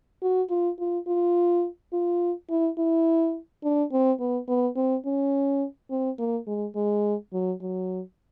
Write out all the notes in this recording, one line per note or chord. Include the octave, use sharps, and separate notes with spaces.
F#4
F4
F4
F4
F4
E4
E4
D4
C4
B3
B3
C4
C#4
C4
A#3
G#3
G#3
F#3
F#3